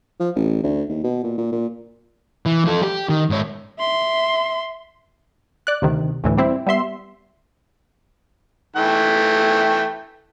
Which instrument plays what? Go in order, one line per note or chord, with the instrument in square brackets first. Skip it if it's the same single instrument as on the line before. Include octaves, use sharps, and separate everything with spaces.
[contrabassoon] F3
A1
D2
D#2
B2
A#2
A#2
A#2
[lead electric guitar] E3
F3 A4
G4
D#3
G#2 C#5
[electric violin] E5 C6
[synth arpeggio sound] D5 F#6
D2 C3 D#3
D2 A2 E3
G3 C4 E4
G3 B3 E5 C6
[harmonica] E3 A3 G5